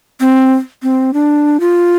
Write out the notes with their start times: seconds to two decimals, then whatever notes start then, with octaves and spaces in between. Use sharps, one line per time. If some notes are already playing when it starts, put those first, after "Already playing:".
0.20 C4
0.83 C4
1.14 D4
1.60 F4